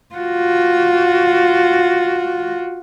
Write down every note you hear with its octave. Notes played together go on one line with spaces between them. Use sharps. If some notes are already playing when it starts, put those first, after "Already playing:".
F4 F#4